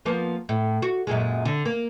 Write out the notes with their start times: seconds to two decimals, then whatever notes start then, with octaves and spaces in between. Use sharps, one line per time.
0.06 F3 A#3 B3
0.49 A2
0.82 F#4
1.07 F#2 A#2 G#3
1.45 D3
1.65 A#3